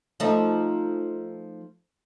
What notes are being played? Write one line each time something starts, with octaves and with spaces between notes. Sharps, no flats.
F3 A3 D#4